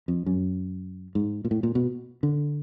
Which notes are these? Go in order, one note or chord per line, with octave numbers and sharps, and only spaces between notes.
F2
F#2
G#2
A#2
A2
A#2
B2
D3